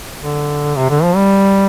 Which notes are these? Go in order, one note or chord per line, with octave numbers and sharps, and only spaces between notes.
D3
C3
D3
F3
G3